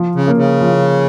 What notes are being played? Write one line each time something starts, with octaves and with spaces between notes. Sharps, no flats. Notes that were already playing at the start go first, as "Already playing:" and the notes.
Already playing: F3
C#3
A#3 C#4
C#3
F3